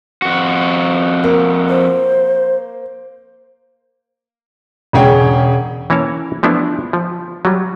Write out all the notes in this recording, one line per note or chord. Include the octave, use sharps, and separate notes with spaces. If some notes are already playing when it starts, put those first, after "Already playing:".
F2 F#4
A#3
C5
E1 C#3 C#4 G#4 C#5 G5
E3 A#3 C#4 A#4 C#5 A5
F3 A3 B3 D4 E4
F3
F#3 G3